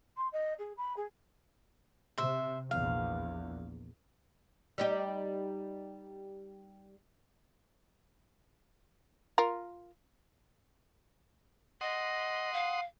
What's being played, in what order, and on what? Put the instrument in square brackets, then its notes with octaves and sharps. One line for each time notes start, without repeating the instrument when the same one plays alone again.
[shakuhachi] C6
D#5
G#4
B5
G#4
[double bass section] C3 [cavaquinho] C5 E5
[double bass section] A#1 E2 [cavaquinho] F5
[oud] G3 D#4 G4
[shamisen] F4 A#4
[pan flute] D#5 [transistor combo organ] F#5 C6 D#6
[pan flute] F5